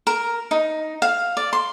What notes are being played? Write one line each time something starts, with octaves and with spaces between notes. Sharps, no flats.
A#4
D#4
F5
D5
C6